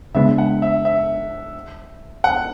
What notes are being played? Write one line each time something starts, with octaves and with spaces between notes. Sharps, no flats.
C#3 G#3 B3 D4 E5
F#5
E5
E5
F#5